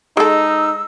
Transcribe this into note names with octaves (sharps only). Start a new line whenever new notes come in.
G#3 D#4 A4 E6